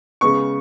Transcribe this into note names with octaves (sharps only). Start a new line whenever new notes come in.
C#3 G#3 B3 C#6